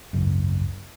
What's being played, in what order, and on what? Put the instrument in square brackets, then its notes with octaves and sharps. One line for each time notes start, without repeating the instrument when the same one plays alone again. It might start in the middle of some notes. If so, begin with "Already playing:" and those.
[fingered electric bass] G#1 C#2 F#2